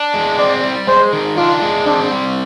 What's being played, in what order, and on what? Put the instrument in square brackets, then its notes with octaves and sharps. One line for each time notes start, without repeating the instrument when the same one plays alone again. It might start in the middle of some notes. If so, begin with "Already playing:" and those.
Already playing: [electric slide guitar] D4
G#3
[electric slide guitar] C4 [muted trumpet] D5
[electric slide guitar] G3
[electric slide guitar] G#3 [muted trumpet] C5
[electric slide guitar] D#3
[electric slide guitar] D4 [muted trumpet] F4
[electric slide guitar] G#3
[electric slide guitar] C4 [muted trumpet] D4
[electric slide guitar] G3